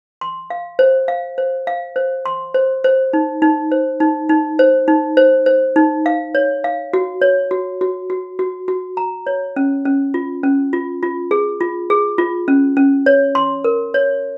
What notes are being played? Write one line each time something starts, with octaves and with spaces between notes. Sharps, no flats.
C6
F5
C5
F5
C5
F5
C5
C6
C5
C5
D#4
D#4
C5
D#4
D#4
C5
D#4
C5
C5
D#4
F5
C#5
F5
F#4
C#5
F#4
F#4
F#4
F#4
F#4
A#5
C#5
C#4
C#4
F4
C#4
F4
F4
G#4
F4
G#4
F4
C#4
C#4
C#5
C6
A#4
C#5